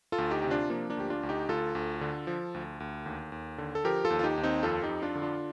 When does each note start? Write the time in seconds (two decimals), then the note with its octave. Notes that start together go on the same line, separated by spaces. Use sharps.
0.12 F4 A4
0.18 D2
0.31 D#4 G4
0.42 C3 G4
0.50 D4 F4
0.70 F3 A#3 D4
0.90 A#3 D4
0.97 D2 G4
1.10 D4 F4
1.23 D2
1.29 D#4 G4
1.49 D2 F4 A4
1.75 D2
2.01 D3
2.27 F3
2.54 D2
2.80 D2
3.06 D#2
3.32 D#2
3.58 D3
3.75 A4
3.84 F3 G4 A#4
4.05 F4 A4
4.10 D#2
4.19 F4
4.24 D#4 G4
4.38 D#2
4.43 C4 D#4
4.63 F2 F4 A4
4.82 D#4 G4
4.89 F2
5.02 D4 F4
5.15 D3
5.22 D4 F4